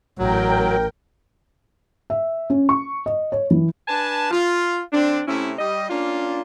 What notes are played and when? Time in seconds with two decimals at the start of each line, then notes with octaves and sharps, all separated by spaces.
0.18 A1 F#3 A#4 G5
2.10 E5
2.50 C#4
2.69 C#6
3.06 D#5
3.32 C#5
3.51 E3
3.88 D4 B4 G#5 A5
4.31 F4
4.92 D3 C4 D4
5.26 C3 A3 C#4 E4
5.59 G3 D#5
5.89 A#3 C#4 D4 F4